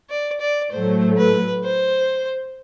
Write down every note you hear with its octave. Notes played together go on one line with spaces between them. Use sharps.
D5
D5
A2 F#3 A3 C5
B4
C5